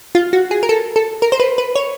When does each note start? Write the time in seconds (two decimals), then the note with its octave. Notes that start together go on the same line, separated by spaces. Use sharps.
0.15 F4
0.33 F#4
0.51 G#4
0.63 A#4
0.69 A4
0.96 A4
1.22 A#4
1.32 C5
1.40 B4
1.58 B4
1.76 C#5